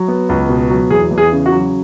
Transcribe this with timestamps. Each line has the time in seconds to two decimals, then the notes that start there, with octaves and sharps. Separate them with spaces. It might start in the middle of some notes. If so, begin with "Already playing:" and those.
Already playing: F#3
0.08 B3
0.29 C#2
0.49 B2
0.70 F#3
0.90 E2 G#4
1.11 E2
1.18 G#4
1.32 C#3
1.46 F#4
1.52 F#3